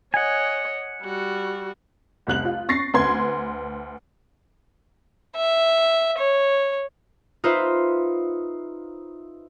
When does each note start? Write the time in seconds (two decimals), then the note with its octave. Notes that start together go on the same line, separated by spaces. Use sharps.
0.14 C#5 D#5 F#5 G#5
1.02 G3 F#4
2.27 F1 C2 F#6 F#7
2.45 F4
2.69 C#6 A6 A#6 C7
2.94 D2 B4 C6 G#6
5.36 E5
6.18 C#5
7.44 D#4 F4 B4 C5 E5